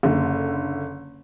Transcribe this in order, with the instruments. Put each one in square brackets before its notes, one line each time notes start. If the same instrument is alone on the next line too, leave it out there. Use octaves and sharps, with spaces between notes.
[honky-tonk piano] F#1 D3